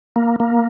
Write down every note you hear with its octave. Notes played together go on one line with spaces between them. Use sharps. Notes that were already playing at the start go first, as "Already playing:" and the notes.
A#3
A#3